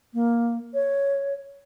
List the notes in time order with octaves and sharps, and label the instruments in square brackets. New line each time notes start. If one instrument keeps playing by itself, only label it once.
[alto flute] A#3
C#5